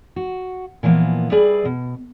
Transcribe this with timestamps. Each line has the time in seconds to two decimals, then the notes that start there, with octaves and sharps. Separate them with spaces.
0.16 F#4
0.83 A#2 E3 F3 A#3 B3
1.31 G3 G#4 B4 D5 E5
1.65 B2